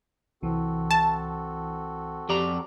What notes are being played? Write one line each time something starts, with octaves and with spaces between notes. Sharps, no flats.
C2 E3 C4 F#4 A4
A5
F2 G4 D5 A#5